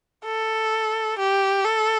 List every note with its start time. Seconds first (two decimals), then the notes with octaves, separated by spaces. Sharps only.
0.25 A4
1.18 G4
1.65 A4